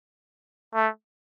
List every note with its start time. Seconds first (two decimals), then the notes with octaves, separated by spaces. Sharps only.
0.75 A3